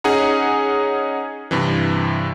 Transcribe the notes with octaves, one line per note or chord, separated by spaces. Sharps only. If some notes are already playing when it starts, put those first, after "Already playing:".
C#4 D#4 G#4 F#5 A#5
G2 C3 E3